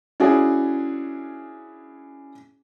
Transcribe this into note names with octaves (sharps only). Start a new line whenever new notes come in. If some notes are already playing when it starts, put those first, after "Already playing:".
C#4 D4 E4 F#4 G#4